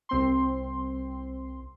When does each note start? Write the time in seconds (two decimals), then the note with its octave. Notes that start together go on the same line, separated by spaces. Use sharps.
0.09 C2 C4 C6